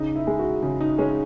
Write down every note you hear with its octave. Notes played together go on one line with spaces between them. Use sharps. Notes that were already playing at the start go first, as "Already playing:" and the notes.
Already playing: C#3 D#4
E4
G#3
F#4
C#3
D#4
G#3 C#4